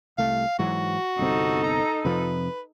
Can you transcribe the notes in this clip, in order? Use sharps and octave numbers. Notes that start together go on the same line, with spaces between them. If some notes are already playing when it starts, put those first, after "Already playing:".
C2 A3 F5
G#2 E3 F#3 F#4
G1 C2 C4 D#4 A4
A#5
F2 C3 F3 B4